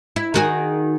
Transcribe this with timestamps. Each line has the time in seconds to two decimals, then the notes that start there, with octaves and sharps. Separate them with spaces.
0.16 E4
0.34 D#3 F#4 G#4